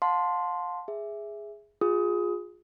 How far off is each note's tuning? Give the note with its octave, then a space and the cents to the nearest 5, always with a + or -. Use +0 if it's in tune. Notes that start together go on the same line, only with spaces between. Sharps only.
F5 +35 A5 +0 C6 +0
G#4 +0 E5 +0
F4 +25 G#4 -10 D#6 +20